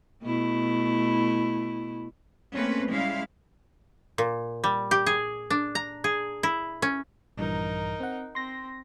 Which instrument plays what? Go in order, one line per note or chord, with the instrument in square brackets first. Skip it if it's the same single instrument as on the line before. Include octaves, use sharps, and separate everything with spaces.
[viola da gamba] B2 A3 E4
[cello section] A3 A#3 C4 C#4 B4
C#3 G3 G#3 E4 F5
[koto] A#2
G3
G4
G#4
D4
A#5
G#4
E4
C#4
[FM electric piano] A#1 G2 E3 [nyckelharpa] D#4 A#4
[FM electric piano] C4 F#5
[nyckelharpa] C4 [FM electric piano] C6 A#6